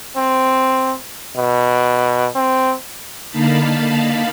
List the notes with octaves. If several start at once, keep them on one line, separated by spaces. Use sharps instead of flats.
C4
B2
C4
D3 A#3 D#4 F5 A5 B5